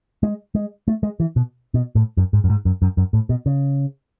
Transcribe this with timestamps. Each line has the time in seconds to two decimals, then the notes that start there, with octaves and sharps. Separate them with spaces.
0.23 G#3
0.55 G#3
0.88 A3
1.03 G#3
1.20 E3
1.36 B2
1.74 B2
1.95 A2
2.17 F#2
2.33 G#2
2.44 F#2
2.50 G#2
2.65 F#2
2.82 F#2
2.97 F#2
3.13 A2
3.29 B2
3.46 C#3